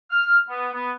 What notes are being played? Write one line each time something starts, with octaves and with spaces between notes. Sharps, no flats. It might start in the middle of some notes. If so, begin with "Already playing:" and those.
F6
B3
B3